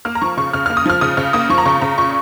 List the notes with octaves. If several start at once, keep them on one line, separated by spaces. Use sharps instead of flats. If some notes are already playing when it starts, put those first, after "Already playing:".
A#3 F6
A#5
F3 C#6
C#3 C#6
C#3 F6
A#3 F6
D#6
F3 F6
C#3 D#6
C#3 F6
A#3 D#6
F3 C#6
A#5
C#3 C#6
C#3 A#5
A#2 C#6